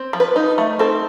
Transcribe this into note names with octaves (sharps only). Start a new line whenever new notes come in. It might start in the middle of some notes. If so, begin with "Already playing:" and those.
Already playing: C4
F3
B4
D#4
A3
C4 A4